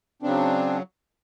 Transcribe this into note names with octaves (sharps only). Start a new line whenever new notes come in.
C#3 F#3 C4 D4